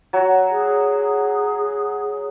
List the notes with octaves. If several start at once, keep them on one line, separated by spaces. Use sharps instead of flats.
F#3 F#4
G#4